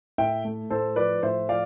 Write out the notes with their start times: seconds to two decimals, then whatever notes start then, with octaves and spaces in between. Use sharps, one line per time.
0.18 A2 E5 G5
0.45 A3
0.70 A2 A4 C5
0.96 F3 B4 D5
1.23 A2 C5 E5
1.48 F3 D5 F5